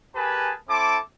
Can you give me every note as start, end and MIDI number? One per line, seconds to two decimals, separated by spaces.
0.15 0.53 67
0.15 0.53 68
0.15 0.53 70
0.15 0.53 71
0.15 0.53 80
0.15 0.53 81
0.69 0.97 60
0.69 0.97 64
0.69 0.97 69
0.69 0.97 81
0.69 0.97 86